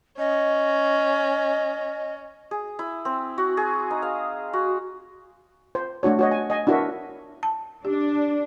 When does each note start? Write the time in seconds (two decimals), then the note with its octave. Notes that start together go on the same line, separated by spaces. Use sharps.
0.19 C#4 D#5
2.51 G#4
2.79 E4
3.05 C4
3.38 F#4
3.57 G#4
3.91 D#4
4.02 F5
4.53 F#4
5.75 C5
6.03 A3 D4 F#4 C#5
6.19 F#4 C#5 D#5
6.31 G#5
6.50 D#5 G#5
6.67 D4 E4 F#4 A#4 E5
7.43 A5
7.85 D4 G4